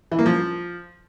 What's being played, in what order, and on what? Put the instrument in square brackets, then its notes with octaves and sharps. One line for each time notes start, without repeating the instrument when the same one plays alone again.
[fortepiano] E3
A#3
F3